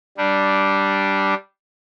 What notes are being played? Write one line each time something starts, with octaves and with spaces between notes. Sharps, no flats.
G3 D4